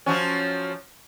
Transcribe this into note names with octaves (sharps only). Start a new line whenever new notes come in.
F3 F#3 C#4